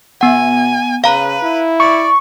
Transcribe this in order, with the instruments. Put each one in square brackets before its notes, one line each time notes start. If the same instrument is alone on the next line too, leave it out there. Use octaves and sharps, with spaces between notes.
[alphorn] B2 [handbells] B3 F#5 [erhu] G#5
[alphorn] C#3 [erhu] B4 [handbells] F5 A#5
[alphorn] E4
[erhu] D5 [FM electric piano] C#6